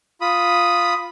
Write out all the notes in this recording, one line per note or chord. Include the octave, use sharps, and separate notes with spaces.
F4 B5 D#6